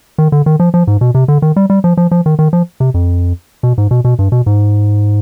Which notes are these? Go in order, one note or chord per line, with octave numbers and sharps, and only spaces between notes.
D#3
D3
D#3
F3
F3
G#2
B2
C3
D3
D#3
G3
G3
F3
F3
F3
D#3
D#3
F3
C3
F2
B2
G#2
B2
B2
G2
B2
G#2